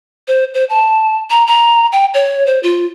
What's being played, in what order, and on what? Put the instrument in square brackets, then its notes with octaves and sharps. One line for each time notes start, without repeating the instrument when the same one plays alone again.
[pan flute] C5
C5
A5
A#5
A#5
G5
C#5
C5
F4